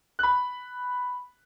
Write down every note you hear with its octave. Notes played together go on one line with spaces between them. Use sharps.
B5 F#6